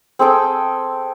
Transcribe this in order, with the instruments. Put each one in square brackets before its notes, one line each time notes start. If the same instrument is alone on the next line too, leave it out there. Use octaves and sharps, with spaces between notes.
[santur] C4 G#4 A4 G5